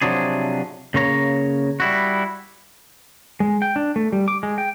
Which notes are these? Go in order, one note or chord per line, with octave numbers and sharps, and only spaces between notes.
C3 F3 F#3 D4 G#4
C#3 A#3 C#5 A#5
G3 E4 F#4
G#3
G5
D4
A3
G3
D6
G#3
G5